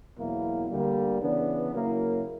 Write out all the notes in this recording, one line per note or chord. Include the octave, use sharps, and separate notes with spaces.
E2 B2 F#3 A#3 E4
D2 D3 G3 A#3
C#3 E3 B3 D4
C#3 F#3 A#3 E4 A#4